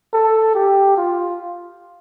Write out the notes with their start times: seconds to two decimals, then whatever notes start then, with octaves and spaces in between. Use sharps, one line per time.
0.13 A4
0.54 G4
0.97 F4